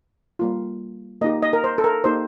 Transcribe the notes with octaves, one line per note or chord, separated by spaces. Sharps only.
G3 A#3 F4
A#3 D#4 G4 D#5
D#5
A#4
C5
A4
A#4
A#3 D#4 G4 C5